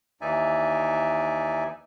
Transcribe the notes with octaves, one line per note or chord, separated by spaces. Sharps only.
D#2 E3 D#4 D5 E5 G#5